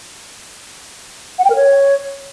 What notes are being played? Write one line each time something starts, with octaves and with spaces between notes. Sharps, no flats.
F#5
G5
A#4
C#5